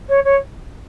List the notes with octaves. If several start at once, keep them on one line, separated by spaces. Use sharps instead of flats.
C#5
C#5